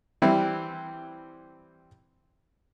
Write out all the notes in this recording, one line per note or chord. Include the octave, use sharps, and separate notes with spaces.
E3 G3 C4 E4